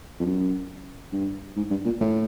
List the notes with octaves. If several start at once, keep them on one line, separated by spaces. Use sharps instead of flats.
F2
F#2
G2
G#2
G2
A#2
A2